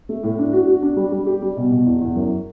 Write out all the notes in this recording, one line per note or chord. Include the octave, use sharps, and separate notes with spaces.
A3
A2
D4
F#4
F#4
D4
G3
G3
G4
G3
B2
B2
E2
E2
F#2